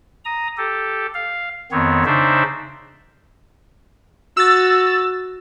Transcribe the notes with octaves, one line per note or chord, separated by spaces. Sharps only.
A#5 D#6
G4 A4
F5
F2 D#3 B3 C4 C#5
C#3 D4 D#4 C5 E5
F#4 E6 A6